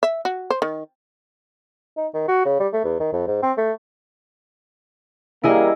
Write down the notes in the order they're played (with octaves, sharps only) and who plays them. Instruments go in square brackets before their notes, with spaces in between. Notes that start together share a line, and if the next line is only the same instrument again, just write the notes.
[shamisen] E5
F#4
C5
D#3
[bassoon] D#4
D#3
F#4
C#3
G3
A3
E2
D#3
F2
G#2
C4
A3
[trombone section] G3 A#3 [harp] E4 G#4 D#5